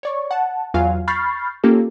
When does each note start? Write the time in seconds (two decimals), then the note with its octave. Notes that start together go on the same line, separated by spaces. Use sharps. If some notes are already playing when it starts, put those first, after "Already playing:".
0.03 C#5 D5 C#6
0.31 F#5 A5
0.74 E2 F#3 F4 F5 G#5
1.08 B5 C#6 F6 G6 A6 C7
1.63 A#3 C#4 F4 G4 A4